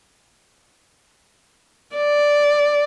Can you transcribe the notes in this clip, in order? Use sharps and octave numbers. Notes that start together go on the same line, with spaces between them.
D5